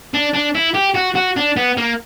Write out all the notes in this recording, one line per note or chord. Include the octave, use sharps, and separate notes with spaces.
D4
D4
E4
G4
F#4
F#4
D4
B3
A#3